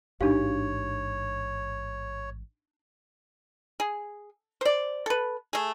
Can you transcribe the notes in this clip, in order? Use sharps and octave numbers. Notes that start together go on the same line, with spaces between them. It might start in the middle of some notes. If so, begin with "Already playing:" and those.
A1 G#2 D4 D#4 F#4 G4 C#5 F5
G#4
C5 D5
A4 B4
A3 G#4